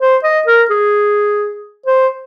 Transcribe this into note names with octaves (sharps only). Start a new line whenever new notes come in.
C5
D#5
A#4
G#4
C5